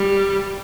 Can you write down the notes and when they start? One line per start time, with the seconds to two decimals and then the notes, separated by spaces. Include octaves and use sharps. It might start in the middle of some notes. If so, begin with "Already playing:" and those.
Already playing: G3